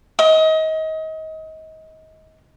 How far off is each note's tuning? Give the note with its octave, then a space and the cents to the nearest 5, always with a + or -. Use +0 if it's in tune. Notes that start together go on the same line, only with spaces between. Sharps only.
D#5 +30